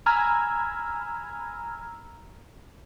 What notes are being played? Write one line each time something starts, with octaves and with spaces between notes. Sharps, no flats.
G#5 A#5 B5 E6 F6 G#6